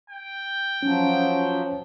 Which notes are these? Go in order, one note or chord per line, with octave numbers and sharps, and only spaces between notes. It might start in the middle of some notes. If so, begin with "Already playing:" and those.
G5
F3 F#3 C#4